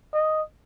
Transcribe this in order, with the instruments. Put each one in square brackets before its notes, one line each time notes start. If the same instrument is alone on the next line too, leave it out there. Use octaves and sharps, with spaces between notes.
[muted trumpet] D#5